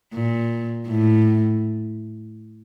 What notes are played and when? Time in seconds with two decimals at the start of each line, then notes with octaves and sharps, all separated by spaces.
0.13 A#2
0.88 A2